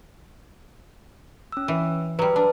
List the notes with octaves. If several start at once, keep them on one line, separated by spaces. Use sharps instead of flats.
C#4 E6
E3
F#3 G3 B4
D4 B4 A5